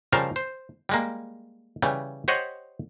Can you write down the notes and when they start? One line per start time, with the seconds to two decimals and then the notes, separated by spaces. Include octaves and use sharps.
0.13 C#3 F3 G3 A#4 F5 A5
0.36 C5
0.89 G3 G#3 A#3
1.82 C#3 E3 G3
2.28 G4 C5 C#5 D#5 F#5